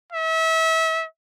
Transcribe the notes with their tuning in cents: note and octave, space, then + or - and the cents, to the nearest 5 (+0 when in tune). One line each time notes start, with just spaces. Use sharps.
E5 -30